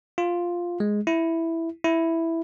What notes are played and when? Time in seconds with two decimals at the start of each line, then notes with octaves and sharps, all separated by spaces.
0.18 F4
0.80 G#3
1.07 E4
1.84 E4